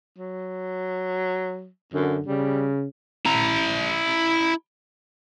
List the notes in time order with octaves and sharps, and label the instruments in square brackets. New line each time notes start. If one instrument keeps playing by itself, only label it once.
[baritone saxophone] F#3
[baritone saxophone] F#2 [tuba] D3
[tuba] C#3 [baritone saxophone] G3
[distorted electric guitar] E4 A#5